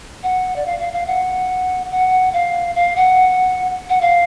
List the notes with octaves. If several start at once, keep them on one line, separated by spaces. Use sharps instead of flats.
F#5
D5
F5
F5
F5
F#5
F#5
F5
F5
F#5
F#5
F5